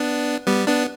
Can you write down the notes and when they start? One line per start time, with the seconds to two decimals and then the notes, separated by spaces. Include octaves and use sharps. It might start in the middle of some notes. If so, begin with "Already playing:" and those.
Already playing: B3 D4
0.47 G3 B3
0.67 B3 D4